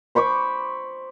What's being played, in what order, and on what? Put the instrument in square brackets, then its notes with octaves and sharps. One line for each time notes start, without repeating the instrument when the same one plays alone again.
[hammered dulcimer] C5 B5 C#6 D6